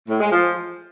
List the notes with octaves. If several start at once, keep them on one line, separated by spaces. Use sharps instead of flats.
A2
G#3
F3